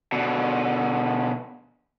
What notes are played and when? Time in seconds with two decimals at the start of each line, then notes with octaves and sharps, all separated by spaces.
0.12 B2 D3